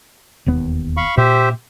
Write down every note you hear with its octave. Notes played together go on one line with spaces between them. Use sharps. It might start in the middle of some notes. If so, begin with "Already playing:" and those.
E1 D#2 B3
F5 B5 C#6
A#2 G4 C5 E5